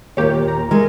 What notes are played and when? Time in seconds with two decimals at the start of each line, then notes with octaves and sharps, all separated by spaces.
0.17 D#2 A#2 A#3 G4 C#5
0.48 A#5
0.71 G#3 A3 A#4